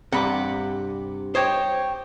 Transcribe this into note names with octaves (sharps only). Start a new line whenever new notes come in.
G2 C3 F#5 B5 D6
G4 C5 C#5 D#5